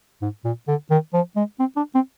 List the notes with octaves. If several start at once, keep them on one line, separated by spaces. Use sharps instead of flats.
G#2
A#2
D3
D#3
F3
G#3
C4
D4
C4